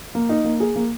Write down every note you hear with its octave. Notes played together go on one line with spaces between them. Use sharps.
A#3
D#4
A#3
G#4
A#3